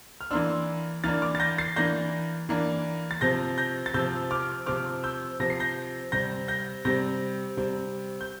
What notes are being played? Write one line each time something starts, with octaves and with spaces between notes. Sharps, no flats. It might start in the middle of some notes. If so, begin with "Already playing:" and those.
F6
E3 A#3 D4 C6 E6
E3 A#3 D4 F6 A6
D6 F6
A6
G6 A#6
A6 C7
E3 A#3 D4 G6 A#6
E3 A#3 D4
A6
C3 F3 C4 G6 A#6
G6 A#6
A6
C3 F3 C4 E6 G6
D6 F6
C3 F3 C4 D6 F6
E6 G6
C3 F3 C4 A#6
C7
G6 A#6
C3 G3 C4 G6 A#6
G6 A#6
C3 G3 C4 G6 A#6
C3 G3 C4
G6